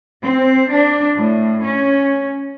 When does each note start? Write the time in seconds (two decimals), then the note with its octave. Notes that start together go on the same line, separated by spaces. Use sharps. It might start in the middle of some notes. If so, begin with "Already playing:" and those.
0.22 C4
0.71 D4
1.14 A2
1.63 C#4